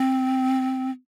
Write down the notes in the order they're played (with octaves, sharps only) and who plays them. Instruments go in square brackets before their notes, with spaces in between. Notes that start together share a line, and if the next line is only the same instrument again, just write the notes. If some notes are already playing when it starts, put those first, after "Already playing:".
Already playing: [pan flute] C4